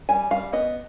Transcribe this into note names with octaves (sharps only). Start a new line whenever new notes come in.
G3 G#5
G3 F5
B3 D#5